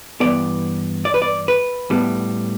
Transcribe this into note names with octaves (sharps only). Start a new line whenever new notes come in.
G2 E3 B3 D5
D5
B4
D5
B4
A2 G3 B3